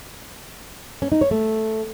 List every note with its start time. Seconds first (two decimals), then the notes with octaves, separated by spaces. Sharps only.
1.02 C#4
1.12 D#4
1.21 C#5
1.31 A3